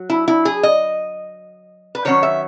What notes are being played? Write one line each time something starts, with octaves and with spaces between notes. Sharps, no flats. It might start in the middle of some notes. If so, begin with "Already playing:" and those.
Already playing: F#3
E4
E4
G#4
D#5
B4
D#3 F#3 C#4 C#5
E5